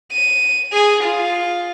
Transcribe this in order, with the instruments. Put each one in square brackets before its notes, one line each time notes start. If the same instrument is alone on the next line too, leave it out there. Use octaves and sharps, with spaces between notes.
[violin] D#7
G#4
F4